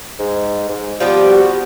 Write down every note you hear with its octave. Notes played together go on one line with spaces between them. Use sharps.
G#2
G#2
F3 G3 B3 G4
F#4